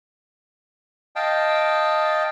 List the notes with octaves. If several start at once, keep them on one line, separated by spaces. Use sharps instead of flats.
D#5 F5 G5 A5